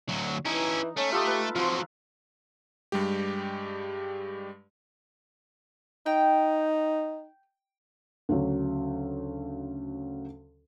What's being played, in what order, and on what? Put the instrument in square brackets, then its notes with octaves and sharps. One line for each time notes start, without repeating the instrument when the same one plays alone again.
[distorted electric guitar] D2 F#3
[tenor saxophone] E3 [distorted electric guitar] C#4 E4 [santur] D#4
[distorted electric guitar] A3 [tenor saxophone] C#4
[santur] F4 A4 D#6 [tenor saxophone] G4
[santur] B4
[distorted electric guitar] F3 F#3 [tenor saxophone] C4 [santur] F4
[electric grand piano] G2 G3 G#3 G4
[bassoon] D#4 [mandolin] G5
[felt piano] D2 C#3 F#3